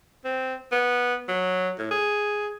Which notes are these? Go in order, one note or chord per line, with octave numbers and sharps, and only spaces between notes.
C4
B3
F#3
A2
G#4